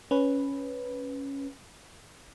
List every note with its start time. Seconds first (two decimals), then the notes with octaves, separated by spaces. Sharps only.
0.11 C#4 B4